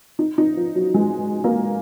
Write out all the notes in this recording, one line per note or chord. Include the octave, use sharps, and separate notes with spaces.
D#4
D#4
F3
F#3
G#3
A#3